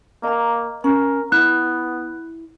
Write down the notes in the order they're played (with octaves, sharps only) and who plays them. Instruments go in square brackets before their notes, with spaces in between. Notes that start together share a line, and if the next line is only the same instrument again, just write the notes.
[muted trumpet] A#3 [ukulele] D#5 A#5
[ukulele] C#4 [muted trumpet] A#4
[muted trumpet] B3 [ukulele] E4 [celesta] F#6